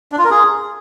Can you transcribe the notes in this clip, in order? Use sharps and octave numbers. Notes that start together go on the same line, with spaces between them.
D4
F4
A#4
G#4